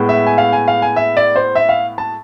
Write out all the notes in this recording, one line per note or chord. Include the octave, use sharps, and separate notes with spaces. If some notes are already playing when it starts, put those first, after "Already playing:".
Already playing: A2 G#3 B3
E5
G#5
F5
G#5
F5
G#5
E5
D5
C5
E5
F5
A5